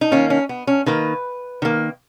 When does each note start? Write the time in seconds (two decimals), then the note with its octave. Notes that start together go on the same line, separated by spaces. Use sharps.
0.01 D#4
0.11 D#3 A#3 C#4
0.30 C#4
0.49 B3
0.67 C#4
0.86 D#3 A#3 B4
1.62 D#3 A#3